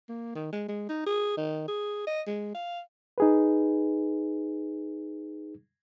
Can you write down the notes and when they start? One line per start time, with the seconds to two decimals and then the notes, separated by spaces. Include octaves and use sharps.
0.09 A#3
0.35 D#3
0.53 G#3
0.69 G#3
0.89 D#4
1.07 G#4
1.37 D#3
1.68 G#4
2.07 D#5
2.27 G#3
2.55 F5
3.18 D#4 G#4 B4